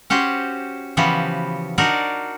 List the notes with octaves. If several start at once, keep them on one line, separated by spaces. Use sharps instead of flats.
C#4 F#4 G4 C5
C#3 E3 F3 B3 F#4 G4
D4 D#4 F#4 A#4 D5